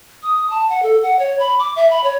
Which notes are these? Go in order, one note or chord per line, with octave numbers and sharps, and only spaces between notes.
D#6
A5
F#5
A4
F#5
C#5
B5
D6
E5
B5
C#5